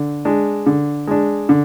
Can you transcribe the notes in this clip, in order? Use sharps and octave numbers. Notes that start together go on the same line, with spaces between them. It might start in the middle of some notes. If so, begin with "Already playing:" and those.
Already playing: D3
G#3 D4
D3
G#3 D4
D3